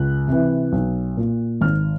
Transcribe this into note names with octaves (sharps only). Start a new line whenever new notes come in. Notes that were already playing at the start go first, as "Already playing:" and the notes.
Already playing: C#2 F#6
C3 E3
B1
A#2
G#1 F6